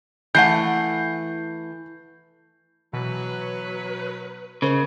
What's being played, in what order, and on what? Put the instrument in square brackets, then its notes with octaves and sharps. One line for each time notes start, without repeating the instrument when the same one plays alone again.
[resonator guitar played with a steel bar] E3 A3 F#5 [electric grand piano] G6 C7
[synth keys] B2 E3 [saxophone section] F#3 B4
[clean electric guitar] C#3 [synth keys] A#4 C5 D#5